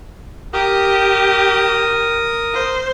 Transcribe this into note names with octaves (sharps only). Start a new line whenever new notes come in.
G4 A#4 D#6
C5